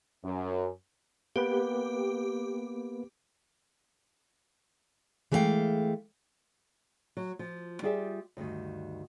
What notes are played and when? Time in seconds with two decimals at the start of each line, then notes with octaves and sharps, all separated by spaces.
0.24 F#2
1.36 A#3 B3 G4 B4
5.32 E3 G#3 A3 A4 F5 G5
7.17 F#3
7.39 F3
7.82 G3 F4 G4 G#4 D5 E5
8.37 D2 G2 D#3